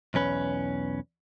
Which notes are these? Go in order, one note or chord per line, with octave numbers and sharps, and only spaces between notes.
B1 E2 C#4 B4